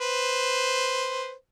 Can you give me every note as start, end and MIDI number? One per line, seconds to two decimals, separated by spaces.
0.01 1.32 71
0.01 1.32 72